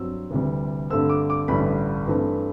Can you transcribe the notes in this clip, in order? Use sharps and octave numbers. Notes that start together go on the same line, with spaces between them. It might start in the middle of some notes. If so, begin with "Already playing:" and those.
Already playing: G2 F#3 C4 E6
D2 C3 E3 G3
G2 D3 A3 C4 E6
D6
D6
A1 G2 D3 G3 B5
G2 E3 A3 C4